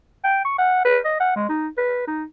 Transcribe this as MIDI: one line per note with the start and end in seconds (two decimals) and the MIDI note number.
0.24 0.40 79
0.45 0.54 85
0.59 0.81 78
0.85 0.99 71
1.05 1.15 75
1.20 1.33 78
1.36 1.45 56
1.49 1.68 63
1.78 2.03 71
2.07 2.24 63